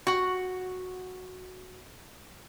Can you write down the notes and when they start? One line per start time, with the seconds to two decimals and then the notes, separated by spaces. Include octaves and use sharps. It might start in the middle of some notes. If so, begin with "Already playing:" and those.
0.07 F#4 F#5